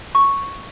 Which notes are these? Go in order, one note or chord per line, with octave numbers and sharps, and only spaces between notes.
C#6